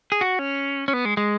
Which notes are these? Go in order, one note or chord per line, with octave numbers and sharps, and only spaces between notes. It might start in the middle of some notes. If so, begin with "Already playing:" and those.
G#4
F#4
C#4
C#4
B3
G#3
G#3